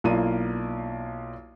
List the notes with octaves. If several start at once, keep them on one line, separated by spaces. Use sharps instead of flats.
B1 A#3 E4 F4 D5 D#7